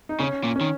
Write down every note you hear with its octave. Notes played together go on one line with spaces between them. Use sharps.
D#4
C#3 C#4
A#2
D#3 C#4